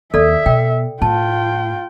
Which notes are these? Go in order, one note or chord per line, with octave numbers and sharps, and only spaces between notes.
D#2 A4 D5 E5
B2 G5
A2 F4 G5 A5